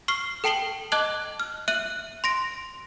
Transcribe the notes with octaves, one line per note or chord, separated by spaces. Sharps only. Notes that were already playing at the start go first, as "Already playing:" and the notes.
C#6 F6 C7 G7
A4 G5 A5 C7 F#7 G7
D#5 A5 D6 F#6 G#6 F#7
F6
E5 F#6 D#7 F#7
C6 A#6 D7